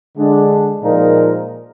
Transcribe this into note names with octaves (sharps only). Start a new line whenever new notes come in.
D3 G#3 D4
A#2 F3 G#3 D#4 A#4